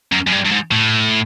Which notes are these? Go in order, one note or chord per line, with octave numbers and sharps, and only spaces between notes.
F#2
F#2
G2
G2
G#2
A2